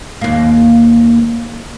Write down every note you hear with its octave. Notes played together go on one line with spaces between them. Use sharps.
D#2 A#3